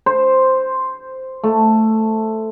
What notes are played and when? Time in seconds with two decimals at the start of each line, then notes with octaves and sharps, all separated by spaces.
0.06 C5
1.44 A3